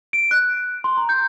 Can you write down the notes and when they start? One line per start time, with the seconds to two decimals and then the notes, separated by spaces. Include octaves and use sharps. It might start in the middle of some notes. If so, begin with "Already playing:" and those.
0.13 D7
0.31 F#6
0.84 C6
0.97 A#5
1.09 G6